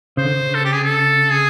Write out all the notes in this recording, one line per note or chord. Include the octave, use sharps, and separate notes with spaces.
C#3 C5
D3
C#3
A4
G4
G#4
A4
G#4